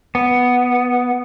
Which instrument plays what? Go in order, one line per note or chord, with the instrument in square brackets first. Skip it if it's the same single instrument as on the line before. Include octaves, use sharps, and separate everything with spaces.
[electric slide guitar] B3